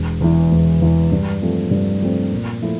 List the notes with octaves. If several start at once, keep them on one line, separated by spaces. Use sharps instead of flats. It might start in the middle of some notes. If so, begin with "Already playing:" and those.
Already playing: E1
E2 E3
E1
E2 E3
G2
F3 A3 C4
G2
F3 A3 C4
A#2
F3 A3 E4